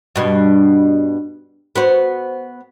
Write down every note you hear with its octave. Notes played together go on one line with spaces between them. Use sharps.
G2 B2
B3 F#4 C5